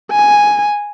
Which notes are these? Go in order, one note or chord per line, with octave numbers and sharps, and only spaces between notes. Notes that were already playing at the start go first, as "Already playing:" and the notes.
G#5